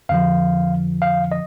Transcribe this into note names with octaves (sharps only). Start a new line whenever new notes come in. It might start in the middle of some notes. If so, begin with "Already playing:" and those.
F2 D3 F3 F5
F5
D#5